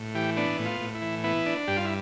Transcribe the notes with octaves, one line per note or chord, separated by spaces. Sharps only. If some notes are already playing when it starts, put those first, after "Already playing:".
Already playing: A2
E3 G4
B3 D4
A2
F4
A2
E4
E3
B3 E4
D4
G2 G4
F4
E4